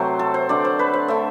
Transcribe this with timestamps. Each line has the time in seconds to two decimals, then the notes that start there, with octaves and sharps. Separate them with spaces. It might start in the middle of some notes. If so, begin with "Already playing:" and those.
Already playing: C3 F#3 A3 C5
0.19 A4
0.34 C5
0.49 D3 A3 D5
0.65 C5
0.79 B4
0.93 C5
1.08 D3 A3 E5